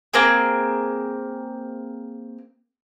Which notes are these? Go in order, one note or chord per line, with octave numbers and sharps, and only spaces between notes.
A#3 C4 G#4